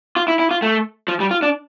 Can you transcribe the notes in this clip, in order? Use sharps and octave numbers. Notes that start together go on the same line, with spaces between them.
F4
E4
E4
F4
A3
F3
G3
F4
D4